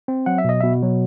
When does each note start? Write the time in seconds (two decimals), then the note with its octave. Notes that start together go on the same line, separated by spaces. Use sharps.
0.08 C4
0.26 F#3 F#5
0.38 E5
0.45 B2 D#5
0.61 B2 E5
0.82 F#3